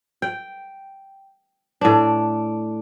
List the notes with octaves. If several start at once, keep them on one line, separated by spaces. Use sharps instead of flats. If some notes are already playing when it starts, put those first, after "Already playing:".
G5
A2 D4